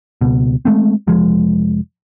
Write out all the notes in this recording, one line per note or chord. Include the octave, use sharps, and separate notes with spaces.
C#2 B2
G#3 A3 C4
F1 F3 G#3